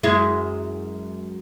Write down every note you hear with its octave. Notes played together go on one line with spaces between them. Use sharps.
F#2 G#3 E4